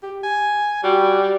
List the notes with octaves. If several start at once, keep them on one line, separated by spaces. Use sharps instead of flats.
G4
G#5
G3 F#4